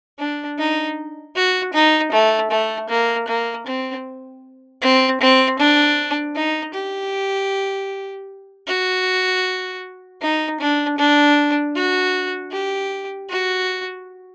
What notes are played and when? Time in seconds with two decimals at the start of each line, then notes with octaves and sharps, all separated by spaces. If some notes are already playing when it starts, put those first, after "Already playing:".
0.19 D4
0.58 D#4
1.35 F#4
1.73 D#4
2.12 A3
2.50 A3
2.89 A#3
3.27 A#3
3.66 C4
4.82 C4
5.20 C4
5.59 D4
6.35 D#4
6.74 G4
8.67 F#4
10.21 D#4
10.60 D4
10.98 D4
11.75 F#4
12.52 G4
13.29 F#4